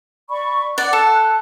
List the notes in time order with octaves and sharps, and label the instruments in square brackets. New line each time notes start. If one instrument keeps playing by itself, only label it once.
[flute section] D5 B5 C#6
[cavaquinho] D5 [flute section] F#5 F#6
[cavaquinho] A4
[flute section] F#6